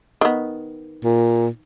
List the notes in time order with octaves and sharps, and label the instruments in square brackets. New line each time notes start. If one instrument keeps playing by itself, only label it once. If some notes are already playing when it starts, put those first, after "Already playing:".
[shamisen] D#3 B3
[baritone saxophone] A#2